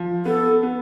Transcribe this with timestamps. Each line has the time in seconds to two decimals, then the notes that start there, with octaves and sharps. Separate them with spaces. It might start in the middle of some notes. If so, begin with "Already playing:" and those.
Already playing: F3
0.25 B3 A4
0.63 B3